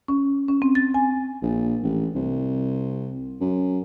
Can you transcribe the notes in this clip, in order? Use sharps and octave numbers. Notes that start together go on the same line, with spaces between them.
C#4
C#4
C4
A6
G#5
A#1
A1
C2
F#2